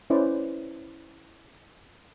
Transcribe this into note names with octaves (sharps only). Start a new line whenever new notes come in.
C#4 E4 B4 C5 D5